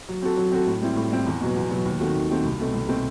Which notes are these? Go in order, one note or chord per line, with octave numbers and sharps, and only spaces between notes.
F#3
C4 F#4 A4
F#3
C4 F#4 A4
A2
G3 C4 E4
A2
G3 C4 E4
E2
B2 F#3 B3
E2
B2 F#3 B3
D#2
D#3 A3 C4 F#4
D#2
D#3 A3 C4 F#4
C2
B2 A3 C4
C2
B2 A3 C4